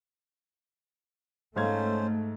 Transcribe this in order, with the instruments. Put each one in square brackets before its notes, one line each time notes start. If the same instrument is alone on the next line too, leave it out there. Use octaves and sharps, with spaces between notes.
[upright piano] G#2 F5 G#6 [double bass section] A3 [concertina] C#4 C5